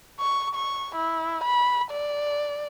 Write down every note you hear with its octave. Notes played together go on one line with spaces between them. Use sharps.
C#6
C#6
E4
B5
D5